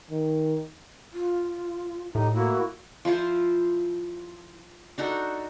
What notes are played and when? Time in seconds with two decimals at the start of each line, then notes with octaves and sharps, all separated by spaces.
0.10 D#3
1.13 F4
2.15 A2 D#4 G4
2.34 A#3 E4 F#4
3.05 F3 E4 F4 C5
4.98 D4 D#4 F#4 A4